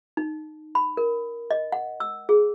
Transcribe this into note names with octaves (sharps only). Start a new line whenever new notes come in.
D#4
B5
A#4
D#5
F#5
E6
G#4